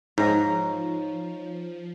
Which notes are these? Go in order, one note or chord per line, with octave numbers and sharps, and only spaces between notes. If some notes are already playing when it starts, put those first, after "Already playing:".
G#2 F3 D#4 C#5 F5 A#5